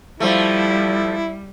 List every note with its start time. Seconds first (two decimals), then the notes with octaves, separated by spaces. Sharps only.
0.20 F3 G3 A3 E4